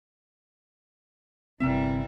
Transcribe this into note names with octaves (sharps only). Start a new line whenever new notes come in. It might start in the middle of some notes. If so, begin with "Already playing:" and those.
G1 C3 E3 G3 C4 E4 A#4 E5